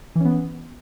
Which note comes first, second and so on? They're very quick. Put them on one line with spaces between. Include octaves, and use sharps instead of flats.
E3 C#4 B3